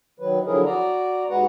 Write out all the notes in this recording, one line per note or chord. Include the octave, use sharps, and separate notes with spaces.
D#3 F#3 B4
D3 F3 F#3 E4 G#4 A#4
F#4 D5 A#5
D#2 G#3 F#4 B4 F#5 A#5